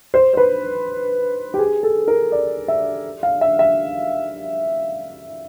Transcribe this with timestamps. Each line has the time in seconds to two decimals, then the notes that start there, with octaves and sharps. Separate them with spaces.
0.14 C5
0.33 C5
0.37 B4
1.54 G4
1.59 G#4
1.83 A4
2.08 A#4
2.32 D5
2.68 E5
3.23 F5
3.41 E5
3.59 E5